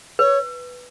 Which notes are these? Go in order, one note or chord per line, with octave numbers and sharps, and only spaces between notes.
B4 C#5